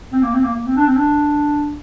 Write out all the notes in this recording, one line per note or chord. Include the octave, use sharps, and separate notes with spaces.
C4
A#3
C4
A#3
A#3
C4
D4
C4
D4